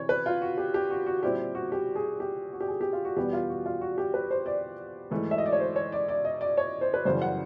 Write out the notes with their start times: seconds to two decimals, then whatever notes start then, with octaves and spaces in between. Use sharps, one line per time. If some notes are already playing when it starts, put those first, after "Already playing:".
Already playing: C3 E3 C#5
0.09 B4
0.26 F4
0.42 F#4
0.57 G4
0.74 G4
0.91 F#4
1.06 F#4
1.23 A#2 G3 C4 E4 G4
1.55 F#4
1.72 G4
1.95 G#4
2.20 G4
2.53 F#4
2.61 G4
2.68 G#4
2.81 G4
2.93 F4
3.05 F#4
3.16 E2 B2 G3 B3 G4
3.33 F4
3.49 F#4
3.66 F4
3.81 F#4
3.98 G4
4.14 B4
4.31 C5
4.46 D5
5.11 G#2 E3 A3
5.31 E5
5.38 D#5
5.46 D5
5.52 C#5
5.60 C5
5.76 C#5
5.92 D5
6.09 D5
6.25 D#5
6.41 D5
6.57 C#5
6.81 C5
6.94 B4
7.05 F#2 C#3 E3 G3 C5
7.22 F#5